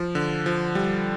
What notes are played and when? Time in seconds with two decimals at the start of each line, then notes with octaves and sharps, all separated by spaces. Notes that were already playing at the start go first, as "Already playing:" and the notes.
Already playing: F3
0.15 D3
0.46 F3
0.75 G3